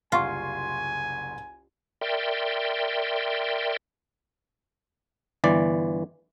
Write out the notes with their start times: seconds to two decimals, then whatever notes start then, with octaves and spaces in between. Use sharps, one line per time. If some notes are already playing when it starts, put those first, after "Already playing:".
0.12 F#1 C2 F4 F#5 G#5 C6 C#6
2.01 A#4 D5 E5 G5 C6
5.44 G1 E3 D5